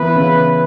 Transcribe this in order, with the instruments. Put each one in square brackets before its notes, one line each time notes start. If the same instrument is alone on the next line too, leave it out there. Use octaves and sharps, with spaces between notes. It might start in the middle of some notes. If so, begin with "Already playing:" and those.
Already playing: [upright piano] E3 B3 E4 [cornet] B4
[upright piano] C#3